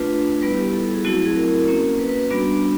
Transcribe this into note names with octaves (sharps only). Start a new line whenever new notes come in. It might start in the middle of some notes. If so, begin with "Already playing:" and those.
Already playing: A3 D4 F4 B4
G3 B3 E4 B4
G4
A4
A4
G#4
F#3 A3 C4 E4 F#4
G#4
A#4
A#3 C#4 F#4
B4
B4
B4
G3 B3 D4 F#4